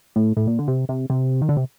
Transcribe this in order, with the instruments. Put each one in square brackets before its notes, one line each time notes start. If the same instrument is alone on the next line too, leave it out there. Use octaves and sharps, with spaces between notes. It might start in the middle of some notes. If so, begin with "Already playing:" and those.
[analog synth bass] A2
A2
A#2
D3
C3
C3
C3
D#3
D3
C3